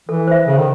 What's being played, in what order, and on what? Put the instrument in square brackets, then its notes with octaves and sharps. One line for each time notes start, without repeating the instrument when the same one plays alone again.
[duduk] E3 [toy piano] A4
[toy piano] C5 E5
[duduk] C#3 [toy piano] A4
[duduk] D#3